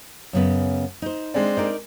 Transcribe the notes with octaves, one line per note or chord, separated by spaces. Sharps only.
F#2 C#3 B3
D#4 C5
G#3 C4 D4
D#4 A#4 D5